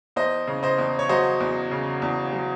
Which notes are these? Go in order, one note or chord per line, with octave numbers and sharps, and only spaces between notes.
E2 C5 D#5
C#3
C5 D#5
E2
C#5
F#3 C5 D#5
E2
C#3
E2
F#3